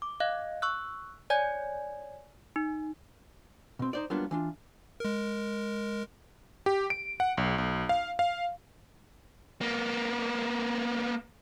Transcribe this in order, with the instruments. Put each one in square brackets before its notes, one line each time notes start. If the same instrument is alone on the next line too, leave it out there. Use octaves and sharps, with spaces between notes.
[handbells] D6
D#5 F5 F#6
C#6 E6 F#6
C#5 D5 G#5 G#6
D#4
[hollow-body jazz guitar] B2 C4
D#4 C5 D5
F#3 G3 A#3 B3 D4 F4
E3 D4 F4
[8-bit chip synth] G#3 A#4
[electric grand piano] G4
D7
F#5
B1
B1
F5
F5
[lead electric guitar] A#3 B3